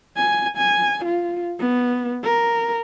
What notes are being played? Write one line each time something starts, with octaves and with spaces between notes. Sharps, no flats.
G#5
G#5
F4
B3
A#4